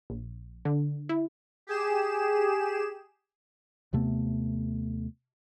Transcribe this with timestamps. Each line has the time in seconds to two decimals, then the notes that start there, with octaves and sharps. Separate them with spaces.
0.10 A#1
0.65 D3
1.09 E4
1.67 G4 G#4 E7
3.93 D#2 C3 A3 B3